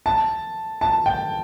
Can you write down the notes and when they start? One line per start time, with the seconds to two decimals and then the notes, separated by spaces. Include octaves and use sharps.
0.06 A5
0.81 A5
1.06 G5